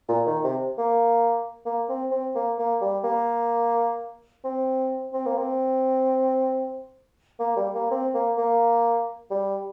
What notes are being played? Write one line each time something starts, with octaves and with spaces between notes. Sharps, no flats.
A#2
D#3
C3
A#3
A#3
C4
C4
A#3
A#3
G3
A#3
C4
C4
A#3
C4
A#3
G3
A#3
C4
A#3
A#3
G3